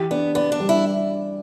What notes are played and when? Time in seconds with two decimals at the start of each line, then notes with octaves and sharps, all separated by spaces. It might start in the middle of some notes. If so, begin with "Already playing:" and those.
Already playing: E3 G4
0.11 B3 D4
0.35 B3 D5
0.52 D4
0.60 G3
0.69 E4